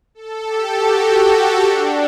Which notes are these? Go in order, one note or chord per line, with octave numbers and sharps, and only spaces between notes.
A4
G4
F#4
D4